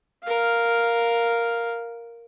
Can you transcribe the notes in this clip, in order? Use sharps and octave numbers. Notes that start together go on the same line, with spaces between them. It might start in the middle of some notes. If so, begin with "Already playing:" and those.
A#4 F5